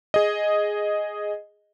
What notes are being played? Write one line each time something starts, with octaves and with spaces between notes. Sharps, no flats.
G#4 D#5